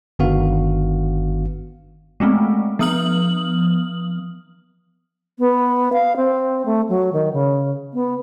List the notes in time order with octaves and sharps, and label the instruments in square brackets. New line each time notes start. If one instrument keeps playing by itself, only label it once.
[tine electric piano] G1 D#3 B3 D4 F#4 F5
[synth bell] G#3 A3 B3 C4
F3 B3 D#6 F6 F#7
[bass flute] B3
F5
C4
A3
F#3
D#3
C#3
B3